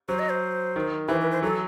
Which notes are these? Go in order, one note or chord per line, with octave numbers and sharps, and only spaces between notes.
F#3 C5
D#5
C5
D#3
E3 C5
B4
C5
F#3 A4